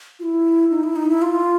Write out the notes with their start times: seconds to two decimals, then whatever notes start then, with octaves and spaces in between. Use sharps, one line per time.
0.19 F4
0.23 E4
0.70 D#4
0.83 E4
0.96 D#4
1.09 E4
1.22 F4